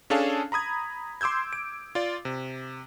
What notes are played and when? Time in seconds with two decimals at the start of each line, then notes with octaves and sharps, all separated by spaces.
0.10 C#4 D4 G#4 A4 F5 A5
0.52 A#5 B5 D#6 G#6
1.21 C6 D6 E6 G6 G#6
1.53 D7
1.95 F4 D5
2.25 C3